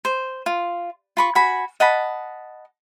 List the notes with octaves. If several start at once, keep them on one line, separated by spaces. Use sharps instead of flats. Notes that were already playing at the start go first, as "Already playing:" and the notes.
C5
F4
F4 B5 C#6
F#4 G#5 B5
D#5 F#5 A5 B5